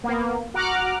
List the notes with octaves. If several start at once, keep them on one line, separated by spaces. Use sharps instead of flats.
A#3 B3
F#4 F#5 A#5 D6 F6 F#6